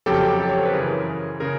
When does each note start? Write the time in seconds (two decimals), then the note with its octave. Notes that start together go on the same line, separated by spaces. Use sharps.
0.06 F2 C#3 F#3 G4 A4
0.40 G4 A4
0.49 C#5
0.57 C5
0.66 B4
0.73 F#2 C#3 E3 G#4 A#4
1.40 C#3 G#4 A#4